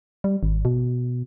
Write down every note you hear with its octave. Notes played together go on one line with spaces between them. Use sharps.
G3
G#1
B2